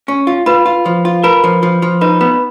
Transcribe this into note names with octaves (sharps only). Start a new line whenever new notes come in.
C#4
F4
F4 B4 B5
F4
F3
F4
A#4 B4 B5
F3
F3
F3
D#4 B4 B5
B3 B4 B5